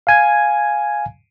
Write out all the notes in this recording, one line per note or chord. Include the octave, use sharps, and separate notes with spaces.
F5 G#5 G#6